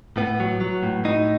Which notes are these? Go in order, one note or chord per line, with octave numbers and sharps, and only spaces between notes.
A2 B3
F#3
F#3
A2
A2 D#4